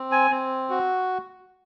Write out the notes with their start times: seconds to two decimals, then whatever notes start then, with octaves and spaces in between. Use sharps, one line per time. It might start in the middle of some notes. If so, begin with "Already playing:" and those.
Already playing: C4
0.12 G#5
0.31 C4
0.70 F#4